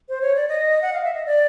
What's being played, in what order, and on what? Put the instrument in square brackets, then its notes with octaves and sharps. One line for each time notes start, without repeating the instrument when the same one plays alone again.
[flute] C5
C#5
D5
D#5
F#5
F5
E5
D#5
D5